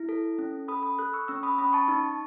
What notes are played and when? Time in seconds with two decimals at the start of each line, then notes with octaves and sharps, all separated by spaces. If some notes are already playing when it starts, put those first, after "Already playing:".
Already playing: E4
0.09 A4
0.39 C#4
0.68 A4 B5 D#6
0.83 B5 D#6
0.99 A4 D#6 F#6
1.13 C#6 E6
1.28 C#4 C#6 E6
1.43 B5 D#6
1.58 C#4 B5 D#6
1.73 A5 C#6
1.88 D#4